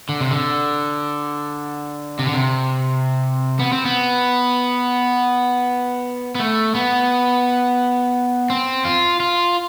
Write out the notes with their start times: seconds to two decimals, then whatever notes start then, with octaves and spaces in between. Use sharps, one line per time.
0.09 D3
0.21 C3
0.31 D3
2.19 C3
2.26 D3
2.34 C3
3.59 B3
3.73 C4
3.85 B3
6.35 B3
6.40 A3
6.75 B3
8.50 C4
8.85 F4
9.20 F4